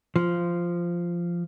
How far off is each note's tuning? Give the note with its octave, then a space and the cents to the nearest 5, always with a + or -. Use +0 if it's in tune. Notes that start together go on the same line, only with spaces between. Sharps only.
F3 -10